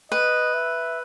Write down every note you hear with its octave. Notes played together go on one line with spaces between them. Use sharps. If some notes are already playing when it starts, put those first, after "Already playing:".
B4 D#5
E5